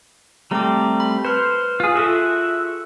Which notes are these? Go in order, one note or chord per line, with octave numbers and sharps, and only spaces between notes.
G3 A3 C4 A#5 D6
B5
B4 C5 F6
F4 G#4
F4 F#4 G#4 A4 E5